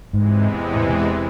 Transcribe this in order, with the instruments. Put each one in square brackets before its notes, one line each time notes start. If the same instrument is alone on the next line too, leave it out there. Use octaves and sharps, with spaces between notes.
[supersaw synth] E2 C3 E3 G#3 [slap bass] G#2
[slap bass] A2
B2